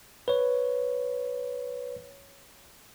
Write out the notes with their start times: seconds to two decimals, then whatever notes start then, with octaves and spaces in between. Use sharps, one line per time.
0.28 B4 C#5